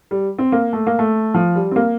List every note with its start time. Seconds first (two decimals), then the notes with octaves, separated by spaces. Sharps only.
0.11 G3
0.39 C4
0.52 A#3
0.73 A3
0.87 A#3
0.99 A3
1.34 F3
1.55 G3
1.71 C4
1.76 A#3